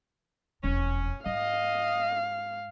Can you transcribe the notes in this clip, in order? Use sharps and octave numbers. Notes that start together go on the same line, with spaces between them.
E1 F2 C#4
G#2 D#5 F5